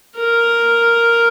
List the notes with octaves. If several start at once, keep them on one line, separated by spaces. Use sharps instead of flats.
A#4